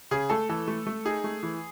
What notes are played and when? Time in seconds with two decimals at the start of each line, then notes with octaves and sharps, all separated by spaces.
0.11 C#3 G#4
0.30 A3 A4
0.49 E3 A4
0.68 A3
0.87 A3
1.05 D#4 G#4
1.24 A3
1.43 E3